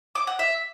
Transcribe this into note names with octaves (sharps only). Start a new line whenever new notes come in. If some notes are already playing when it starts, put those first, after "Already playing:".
D6
F#5
E5